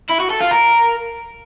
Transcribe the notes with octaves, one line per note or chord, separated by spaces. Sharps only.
E4
F#4
A4
F4
A#4